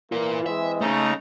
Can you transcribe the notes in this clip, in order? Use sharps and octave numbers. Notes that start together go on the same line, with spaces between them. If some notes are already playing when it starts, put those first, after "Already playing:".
E3 A#3 F4 A#4
G#3 C4 E5
C#3 A3 D#4 A#5